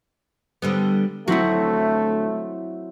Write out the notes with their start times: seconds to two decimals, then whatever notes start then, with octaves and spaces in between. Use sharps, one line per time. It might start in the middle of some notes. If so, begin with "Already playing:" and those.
0.62 D3 G3 B3
1.28 D2 F#3 A3 C4 E4 F#4